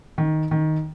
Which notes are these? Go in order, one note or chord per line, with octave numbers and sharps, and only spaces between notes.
D#3
D#3